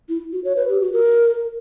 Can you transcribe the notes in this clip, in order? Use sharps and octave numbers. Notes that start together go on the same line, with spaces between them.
E4
F#4
C#5
B4
G4
F#4
A#4